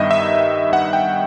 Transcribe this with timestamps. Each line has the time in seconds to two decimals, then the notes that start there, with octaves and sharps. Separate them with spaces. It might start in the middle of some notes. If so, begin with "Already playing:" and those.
Already playing: G2 D#3 G3 B3 D#4 D#5 E5
0.11 E5
0.73 F#5
0.93 G5